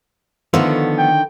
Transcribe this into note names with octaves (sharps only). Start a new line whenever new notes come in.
D3 D#3 F3 A3 B3
G5